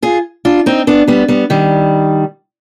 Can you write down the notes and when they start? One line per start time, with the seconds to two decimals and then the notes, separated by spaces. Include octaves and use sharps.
0.02 F4 G#4
0.45 D4 F4
0.66 C4 D#4
0.87 B3 D4
1.08 G3 B3
1.28 G3 B3
1.50 D#3 G3